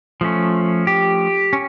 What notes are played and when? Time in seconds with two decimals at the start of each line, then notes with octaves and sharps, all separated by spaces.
0.21 F3 A3 C#4
0.87 G4
1.53 C#4